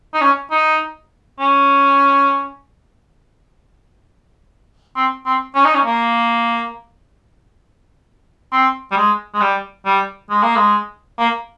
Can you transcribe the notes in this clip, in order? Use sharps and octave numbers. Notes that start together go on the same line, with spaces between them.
D#4
C#4
D#4
C#4
C4
C4
C#4
D#4
C#4
A#3
C4
G3
G#3
G#3
G3
G3
G#3
A#3
G#3
A#3